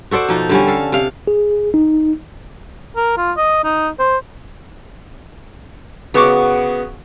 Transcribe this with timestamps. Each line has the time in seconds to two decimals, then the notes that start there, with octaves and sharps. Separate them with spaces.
0.11 F#4 A4 C5 D5
0.29 B2 F3 D#4
0.49 D3 G3 C#4
0.67 A4 F5
0.92 C3 F5
1.27 G#4
1.74 D#4
2.96 A#4
3.17 F4
3.37 D#5
3.64 D#4
3.99 C5
6.14 C#3 B3 F#4 C#6 D6